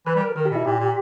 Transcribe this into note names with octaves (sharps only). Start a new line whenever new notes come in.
E3 B4
G3
A#4
D#3 A#4
G4
B2 E4
A#2 G4
A#2